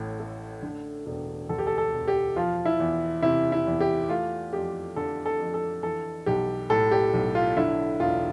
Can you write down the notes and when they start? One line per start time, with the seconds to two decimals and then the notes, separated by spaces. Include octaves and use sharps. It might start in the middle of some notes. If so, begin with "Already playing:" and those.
Already playing: A1 A2
0.19 A3
0.62 D3
1.06 E1
1.49 D2 A4
1.59 G4
1.67 A4
1.78 A4
1.93 E1
2.08 G4
2.36 F3 F4
2.65 E4
2.80 E2
3.22 C3 E4
3.52 E4
3.67 E2
3.80 G4
4.09 A3 F4
4.53 F2 G4
4.96 D3 A4
5.26 A4
5.39 F2
5.54 A4
5.83 E3 A4
6.26 B1 G4
6.70 A2 A4
6.91 G4
7.14 B1
7.35 F4
7.57 D3 E4
8.00 E1 F4